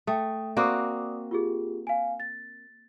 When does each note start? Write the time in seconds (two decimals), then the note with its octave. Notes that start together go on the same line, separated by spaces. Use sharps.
0.07 A3 G5 D#6
0.57 A#3 C4 F#4 D5 D6 D#6
1.31 F4 G4 G#4
1.87 F5 G#5
2.20 A6